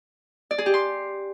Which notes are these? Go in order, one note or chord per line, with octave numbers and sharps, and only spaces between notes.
D5
G#4
G4
C6